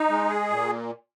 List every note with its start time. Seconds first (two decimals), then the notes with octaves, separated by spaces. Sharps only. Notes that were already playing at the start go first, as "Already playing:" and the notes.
Already playing: D#4
0.09 G#3
0.28 G#4
0.50 A#2